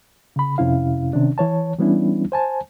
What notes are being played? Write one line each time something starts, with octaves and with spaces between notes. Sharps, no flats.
C#3 B5
F2 C3 C#4 E4 F5
C3 D#3 C#4 D4
E3 C#5 A5
E3 G3 B3 C#4 D4 E4
C5 G#5 A5